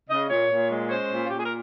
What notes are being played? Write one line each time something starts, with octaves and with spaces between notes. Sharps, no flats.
C#3 D#5
A#2 C#5
A#2
G#3
C#5
C#4 C5
A#2
F4
A#2 G4
G#4
A#4